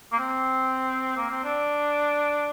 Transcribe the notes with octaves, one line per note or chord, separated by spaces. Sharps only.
A#3
C4
A#3
C4
D4